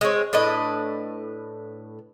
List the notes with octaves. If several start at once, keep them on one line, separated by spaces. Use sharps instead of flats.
G#3 C4 C#5
A2 D4 B4 D#5